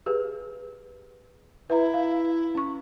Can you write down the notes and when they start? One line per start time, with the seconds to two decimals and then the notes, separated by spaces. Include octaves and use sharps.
0.06 G4 G#4 B4
1.70 E4 B4 E5 A#5
1.94 F5
2.55 C#4 C#6